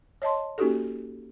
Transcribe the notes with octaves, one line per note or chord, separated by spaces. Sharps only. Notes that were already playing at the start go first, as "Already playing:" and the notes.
C#5 D#5 A5 C6
A#3 C#4 D#4 F#4 G4 A4